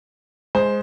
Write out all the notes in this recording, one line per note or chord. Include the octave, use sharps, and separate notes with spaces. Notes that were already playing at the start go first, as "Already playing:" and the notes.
G#3 C5